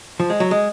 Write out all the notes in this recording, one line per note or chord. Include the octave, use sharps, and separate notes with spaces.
F3
G#3
F#3
G#3